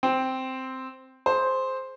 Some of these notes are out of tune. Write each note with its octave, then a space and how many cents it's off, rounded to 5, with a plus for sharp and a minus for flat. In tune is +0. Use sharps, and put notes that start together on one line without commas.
C4 -5 G5 +0
G#4 +30 C5 +0